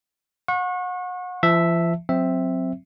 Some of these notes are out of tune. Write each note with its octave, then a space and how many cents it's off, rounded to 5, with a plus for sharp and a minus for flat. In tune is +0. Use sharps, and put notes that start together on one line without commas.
F#5 -35 C#6 -30
F3 -40 E5 +0 A5 +0
F#3 -25 C4 +0 E5 +0